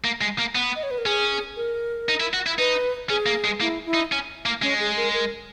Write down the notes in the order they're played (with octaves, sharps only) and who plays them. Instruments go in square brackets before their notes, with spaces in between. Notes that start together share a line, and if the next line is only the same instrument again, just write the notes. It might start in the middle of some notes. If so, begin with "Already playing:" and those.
[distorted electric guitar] A#3
G#3
A#3
B3
[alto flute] D#5
C#5
B4
A#4
[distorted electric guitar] C#4 [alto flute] G#4
[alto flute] A#4
[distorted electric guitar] D#4
E4
F#4
E4
[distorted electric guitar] D#4 [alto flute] B4
[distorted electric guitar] C#4 [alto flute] G#4
[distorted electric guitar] A#3
G#3
[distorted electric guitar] A#3 [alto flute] E4
[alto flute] E4
[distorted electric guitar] D#4
C#4
A#3
[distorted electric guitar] G#3 [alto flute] C#4
[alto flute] G#4
A#4
A#4